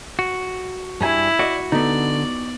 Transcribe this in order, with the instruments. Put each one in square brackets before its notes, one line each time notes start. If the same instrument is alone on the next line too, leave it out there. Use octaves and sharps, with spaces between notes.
[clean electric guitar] F#4
[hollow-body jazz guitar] G2 G3 G#5 [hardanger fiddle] E4
[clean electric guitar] F#4 [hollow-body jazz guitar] D5 D#5
[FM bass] D3 [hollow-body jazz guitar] B3 D#4 [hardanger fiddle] D5